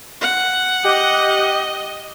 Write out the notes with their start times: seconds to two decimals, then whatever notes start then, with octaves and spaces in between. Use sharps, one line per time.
0.21 F#5
0.84 G4 D#5